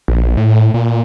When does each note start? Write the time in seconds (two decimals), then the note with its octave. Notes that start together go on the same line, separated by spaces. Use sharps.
0.08 A#1
0.37 A2
0.74 A#2